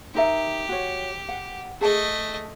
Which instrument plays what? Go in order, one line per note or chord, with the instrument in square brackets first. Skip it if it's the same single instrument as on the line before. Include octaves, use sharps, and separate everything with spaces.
[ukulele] D#4 A#4 E5 [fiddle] G4
[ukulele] F#4 C#5
F#5
[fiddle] A3 D#5 [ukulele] G#4 A5